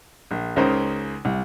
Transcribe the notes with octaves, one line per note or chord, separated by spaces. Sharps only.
A#1
C#2 C#3 D#4 A#4 C5
C2